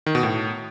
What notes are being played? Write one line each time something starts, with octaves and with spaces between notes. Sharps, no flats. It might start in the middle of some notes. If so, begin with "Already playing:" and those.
D#3
B2
A2